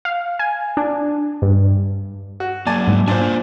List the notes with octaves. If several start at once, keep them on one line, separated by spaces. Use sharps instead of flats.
F5
G#5
D4
G2
F#4
F#3 A#3 D5 G#5 A5
G#2
A#3 D4 F4 C5 G#5